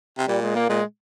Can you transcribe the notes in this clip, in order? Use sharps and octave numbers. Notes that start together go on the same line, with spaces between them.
C3
A#2 G3
G#3
A#3
A#2 G#3